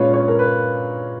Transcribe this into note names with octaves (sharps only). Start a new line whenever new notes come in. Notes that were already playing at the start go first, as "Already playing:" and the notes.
Already playing: A#2 G#3 C#4 F4 B4 C#5
C#5
A#4
B4